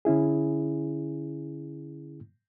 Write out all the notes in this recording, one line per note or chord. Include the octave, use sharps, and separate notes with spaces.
D3 C#4 E4 G#4